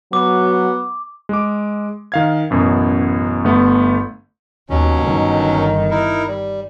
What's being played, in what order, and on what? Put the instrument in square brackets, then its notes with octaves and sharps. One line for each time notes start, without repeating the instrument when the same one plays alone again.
[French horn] F#3 [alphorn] B3 [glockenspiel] D6
[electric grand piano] G#3 D6
D#3 F5 G#6
A1 F#2 B2
G1 A3 B3
[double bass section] D#2 [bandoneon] B2 F#3 C#4
[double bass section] G1 D#3
[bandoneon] D#4 E4 A#4
G3